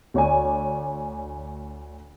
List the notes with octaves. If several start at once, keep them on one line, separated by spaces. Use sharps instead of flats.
D2 C#5 D5 G#5